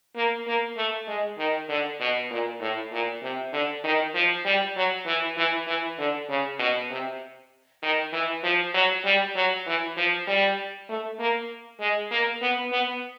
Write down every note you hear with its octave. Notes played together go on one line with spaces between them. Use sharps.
A#3
A#3
A3
G#3
D#3
D3
B2
A#2
A2
A#2
C3
D3
D#3
F3
G3
F#3
E3
E3
E3
D3
C#3
B2
C3
D#3
E3
F3
F#3
G3
F#3
E3
F3
G3
A3
A#3
G#3
A#3
B3
B3